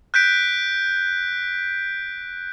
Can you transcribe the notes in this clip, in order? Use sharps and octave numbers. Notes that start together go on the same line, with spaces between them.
F#6 G6 B6 D7